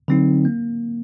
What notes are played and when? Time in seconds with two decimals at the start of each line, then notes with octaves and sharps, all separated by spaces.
0.08 D3 F#3 C4 D#4
0.45 A#3